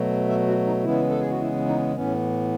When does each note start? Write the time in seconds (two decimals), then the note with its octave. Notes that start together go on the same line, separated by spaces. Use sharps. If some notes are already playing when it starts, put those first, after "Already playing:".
Already playing: B2 F#3 A3
0.29 E5
0.48 F#4
0.66 D#4
0.84 C#3 E3 G#3 B3 E4
1.10 A4
1.20 G#4
1.30 F#4
1.40 E4
1.68 D#4
1.96 A2 E3 B3 C#4